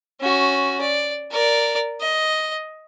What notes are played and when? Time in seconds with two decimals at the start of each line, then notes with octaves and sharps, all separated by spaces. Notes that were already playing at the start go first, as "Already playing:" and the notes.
0.21 C#4 F#4
0.81 D5
1.31 A#4 D5
2.00 D#5